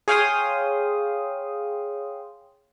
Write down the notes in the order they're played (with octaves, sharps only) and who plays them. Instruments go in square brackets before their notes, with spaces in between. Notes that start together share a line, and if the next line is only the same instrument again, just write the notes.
[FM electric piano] G#4 C#5 F5 G5 C6 D#6